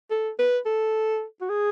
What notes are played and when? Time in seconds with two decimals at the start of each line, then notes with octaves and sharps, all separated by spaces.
0.11 A4
0.39 B4
0.66 A4
1.41 F#4
1.49 G#4